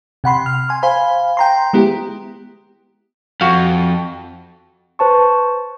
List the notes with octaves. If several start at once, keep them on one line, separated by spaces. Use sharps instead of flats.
C3 F#5 B5 C6
F6
G#5 C6
C5 F5 G#5 B5
G5 A#5 C6
G#3 B3 E4 G4
F2 F#4 F5
B4 C5 A5 C#6